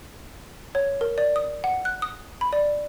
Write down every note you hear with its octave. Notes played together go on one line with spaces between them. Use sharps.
C#5
A#4
D5
D#6
F#5
F#6
D#6
B5
D5